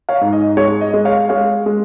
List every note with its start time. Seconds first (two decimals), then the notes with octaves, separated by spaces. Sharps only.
0.09 C#5 F5
0.21 G#2
0.33 D#5
0.57 G#3 C#5
0.81 D#5
0.94 G#3
1.05 C#5 F5
1.29 G#3 C#5 F5
1.66 G#3